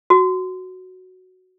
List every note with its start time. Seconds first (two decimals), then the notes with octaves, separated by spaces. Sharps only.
0.10 F#4